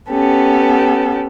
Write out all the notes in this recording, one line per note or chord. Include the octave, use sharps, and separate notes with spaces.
B3 C#4 G4 A4